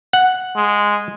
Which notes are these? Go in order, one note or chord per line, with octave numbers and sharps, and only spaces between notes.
F#5
G#3